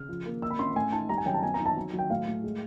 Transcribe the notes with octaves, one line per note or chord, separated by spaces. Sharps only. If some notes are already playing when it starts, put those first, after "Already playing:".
Already playing: C#3 F6
F3
A#3
A#3 E6
B5
C#4 C6
A2 G#5
D#4 A5
G3 A#5
G#5
F#2 G5
A5
B3 G#5
A#5
D#4
A5
F#3
F#3
G5
A2 F5
A2
G#3